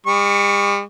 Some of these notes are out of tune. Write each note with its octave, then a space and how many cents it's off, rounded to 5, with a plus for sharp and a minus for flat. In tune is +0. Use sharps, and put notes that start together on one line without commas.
G3 +45 C#6 +15